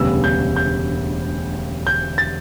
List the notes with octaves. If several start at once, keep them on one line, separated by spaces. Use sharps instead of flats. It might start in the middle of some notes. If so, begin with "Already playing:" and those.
Already playing: E1 D2 C#3 G3 B3 E6
G6
G6
G6
A6